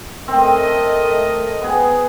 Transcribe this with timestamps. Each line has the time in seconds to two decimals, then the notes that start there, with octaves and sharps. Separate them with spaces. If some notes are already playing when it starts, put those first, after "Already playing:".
0.28 A3 C4 A#4 D#5
1.62 B3 G#4